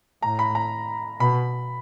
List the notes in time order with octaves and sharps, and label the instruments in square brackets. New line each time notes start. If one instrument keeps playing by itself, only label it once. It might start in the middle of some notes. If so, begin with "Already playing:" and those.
[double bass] A2 [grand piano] A#5
[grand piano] B5
A#5
[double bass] B2 [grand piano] B5